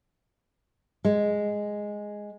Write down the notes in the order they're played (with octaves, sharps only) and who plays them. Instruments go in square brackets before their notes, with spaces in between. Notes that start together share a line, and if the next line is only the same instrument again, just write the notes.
[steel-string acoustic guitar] G#3